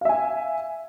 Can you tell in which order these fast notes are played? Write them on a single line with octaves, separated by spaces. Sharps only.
F5 E5 G#5